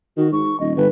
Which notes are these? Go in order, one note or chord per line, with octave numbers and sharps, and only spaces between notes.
D#3 F#4
G#2 C#6
D#1 D#5
G1 B4